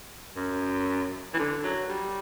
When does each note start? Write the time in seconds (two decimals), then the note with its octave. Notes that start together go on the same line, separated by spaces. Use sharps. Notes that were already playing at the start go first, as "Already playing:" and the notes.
0.36 F#2
1.34 E3
1.39 D3
1.64 F#3
1.89 G3